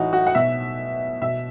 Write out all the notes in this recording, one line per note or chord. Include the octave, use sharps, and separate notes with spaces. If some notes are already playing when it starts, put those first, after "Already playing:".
Already playing: A2 E3 D#4 F#4
F#4
F#5
B2 E5
B2 E5